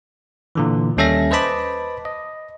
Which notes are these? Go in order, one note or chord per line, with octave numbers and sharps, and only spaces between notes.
A#2 D3 E3
D#2 G3 C#4 A4 E5 A#6
B4 C5 D#5 A5 B5 D6
D#5